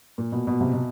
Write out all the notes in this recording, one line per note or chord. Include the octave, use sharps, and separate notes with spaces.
A#2
B2
B2
C3
B2